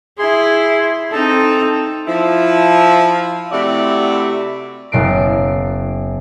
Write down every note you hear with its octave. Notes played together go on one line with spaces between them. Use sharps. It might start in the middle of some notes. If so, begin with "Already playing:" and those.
E4 G#4 C6
C4 D#4 A4 A5
F3 E4
C3 A3 E4 F#4 D5 E5
F#1 B2 C7 D7